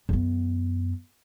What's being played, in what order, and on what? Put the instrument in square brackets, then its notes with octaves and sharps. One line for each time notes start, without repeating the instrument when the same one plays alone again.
[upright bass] F#2 B3